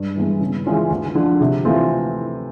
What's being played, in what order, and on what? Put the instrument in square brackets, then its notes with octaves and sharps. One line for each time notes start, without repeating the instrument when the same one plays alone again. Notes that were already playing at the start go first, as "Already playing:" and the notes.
Already playing: [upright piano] G2
E3 G#3 B3
C#3
E3 G#3 C#4 F4
D2
D3 F3
C3
E3 A3 C4 F4